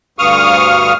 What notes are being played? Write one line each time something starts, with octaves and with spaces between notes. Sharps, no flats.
D2 G2 F5 C#6 D#6 F6